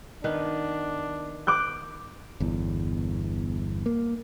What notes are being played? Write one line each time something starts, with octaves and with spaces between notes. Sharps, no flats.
D#3 B3 D4 B4
D6 F#6 G6
G1 E2
A#3